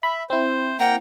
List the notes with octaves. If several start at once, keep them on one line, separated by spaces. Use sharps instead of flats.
E5 B5
C4 E4 C5
A#3 F#5 G5 A#5